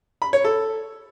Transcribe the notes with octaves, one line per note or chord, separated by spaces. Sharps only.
B5
C#5
A4